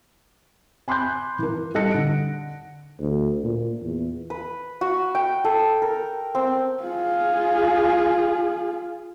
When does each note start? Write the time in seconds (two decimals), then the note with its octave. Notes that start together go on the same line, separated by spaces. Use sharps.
0.88 G#5 B5 C6 D6 F#6 G6
1.39 E3 A#4
1.75 G3 A4 D#5 F#6 A#6 C#7
1.92 D3 D7
3.00 D2
3.43 A#2
3.82 E2
4.30 B4
4.81 F#4
5.15 G5
5.45 A4
5.82 A#4
6.35 C4
6.83 F4 G#4